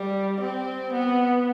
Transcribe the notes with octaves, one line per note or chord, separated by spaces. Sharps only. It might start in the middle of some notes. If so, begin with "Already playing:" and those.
Already playing: G3
C4
B3